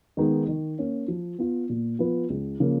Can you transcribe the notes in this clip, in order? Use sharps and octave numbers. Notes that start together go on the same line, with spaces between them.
D#3 G#3 B3 D#4
D#3
A#3 C#4
F3
B3 F4
A#2
F3 B3 F4 B4
C#2
C#3 F3 A#3